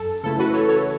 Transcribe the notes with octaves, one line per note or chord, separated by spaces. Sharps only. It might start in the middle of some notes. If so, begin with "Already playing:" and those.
Already playing: F#2 A4
C#3 E3 A3 E4 A4
F#4 B4
A4 C#5
A4 C#5